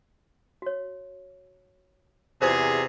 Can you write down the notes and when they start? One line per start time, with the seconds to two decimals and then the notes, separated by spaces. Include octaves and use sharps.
0.62 F#4 C#5
2.41 E2 C3 F4 G#4 C5